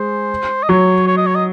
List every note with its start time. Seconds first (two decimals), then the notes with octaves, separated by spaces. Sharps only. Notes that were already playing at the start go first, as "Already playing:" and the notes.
Already playing: G#3 C5
0.63 D#5
0.69 F#3 C#5
1.07 C#5
1.17 D#5
1.26 C#5
1.35 D#5